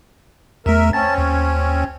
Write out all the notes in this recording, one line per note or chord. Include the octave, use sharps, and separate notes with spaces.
E2 A3 A#4 E5
C4 C#4 C#5 A5 A6
D#2